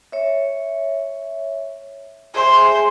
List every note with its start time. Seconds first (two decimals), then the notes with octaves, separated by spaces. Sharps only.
0.12 C#5 E5
2.35 G#4 C5 E5 G#5